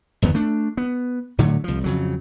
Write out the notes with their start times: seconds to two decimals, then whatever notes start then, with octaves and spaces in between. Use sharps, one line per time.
0.22 G1 E2 D#3 B3
0.35 A3 D4
0.77 B3
1.38 A2 D3 F#3 A3
1.64 C2 F3
1.84 F2 C#3 F#3